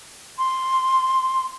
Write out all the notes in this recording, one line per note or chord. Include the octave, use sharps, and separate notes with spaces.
C6